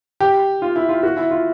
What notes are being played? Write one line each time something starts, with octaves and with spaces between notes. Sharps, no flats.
G4
F4
E4
F4
F#4
E4
F4